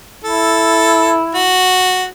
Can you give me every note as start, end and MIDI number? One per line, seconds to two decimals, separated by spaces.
0.24 1.57 64
0.24 1.21 69
1.35 2.06 66